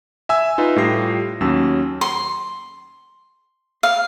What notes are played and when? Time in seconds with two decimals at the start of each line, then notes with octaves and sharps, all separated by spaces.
0.29 E5 G#5 E6
0.58 D#4 F4 B4
0.76 A2 G3 F4 G4 A#6 C7
1.41 D#2 F#3 C#4 E6
2.01 C6
3.83 F5